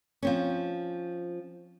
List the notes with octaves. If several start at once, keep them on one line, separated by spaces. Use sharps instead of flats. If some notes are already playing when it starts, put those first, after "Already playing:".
F3 C4 C#4